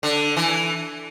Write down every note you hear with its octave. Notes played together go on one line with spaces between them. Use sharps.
D3
E3